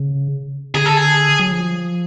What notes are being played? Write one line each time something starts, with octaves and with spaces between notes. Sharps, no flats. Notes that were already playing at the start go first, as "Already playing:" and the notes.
Already playing: C#3
D3 G#4
A4
G#4
F#3
F3